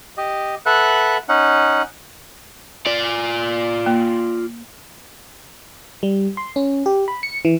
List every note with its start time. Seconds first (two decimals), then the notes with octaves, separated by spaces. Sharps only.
0.17 G4 D#5
0.66 A4 B4 E5 F#5 F#6
1.29 C#4 D#4 F#5
2.86 F4 D5
3.86 A#3
6.03 G3
6.37 C6
6.56 C#4
6.86 G4
7.08 B5
7.23 C#7
7.45 E3